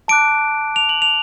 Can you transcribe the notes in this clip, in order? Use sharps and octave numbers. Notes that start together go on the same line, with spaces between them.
A5 D6 F#6 D7
F7
F#7
F7